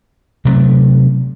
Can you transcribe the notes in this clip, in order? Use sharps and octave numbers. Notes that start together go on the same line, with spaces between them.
C3 F#3 A3